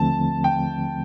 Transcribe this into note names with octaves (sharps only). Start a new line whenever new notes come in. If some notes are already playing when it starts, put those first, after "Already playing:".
Already playing: D#2 D3 F3 A3 C4 A5
G5